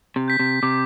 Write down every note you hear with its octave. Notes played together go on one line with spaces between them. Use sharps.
C3
G6 B6
C3
C3 D6